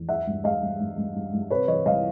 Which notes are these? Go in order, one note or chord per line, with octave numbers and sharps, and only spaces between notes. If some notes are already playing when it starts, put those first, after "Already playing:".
Already playing: E2
E3 E5 F#5
G2
G2 D#5 F5
G2
G2
G2
G2
G2
C3 B4 C#5
E3 C#5 D#5
C2 D#5 F5